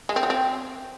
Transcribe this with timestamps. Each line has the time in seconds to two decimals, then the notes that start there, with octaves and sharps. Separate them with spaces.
0.09 G#3
0.16 C4
0.23 F#3
0.30 C4